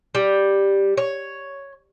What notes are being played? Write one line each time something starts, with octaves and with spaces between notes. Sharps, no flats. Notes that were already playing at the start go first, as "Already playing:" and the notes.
G3
C#5